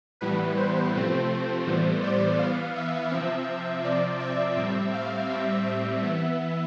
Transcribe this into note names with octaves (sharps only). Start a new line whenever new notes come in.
A2 E3 G3 B3 B4
C5
C3 F3 A3 C4
A2 E3 G3 B3
D5
E3 B3 F5
E5
C3 F3 C4 E5
C3 F3 C4 D5
E5
A2 G3 C4
F5
A2 G3 C4 E5
E5
E3 B3